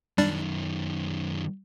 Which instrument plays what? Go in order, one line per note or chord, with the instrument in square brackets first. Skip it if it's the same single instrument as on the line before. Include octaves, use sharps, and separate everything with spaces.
[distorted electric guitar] F#2 D#3 [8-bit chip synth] G3 D4 D5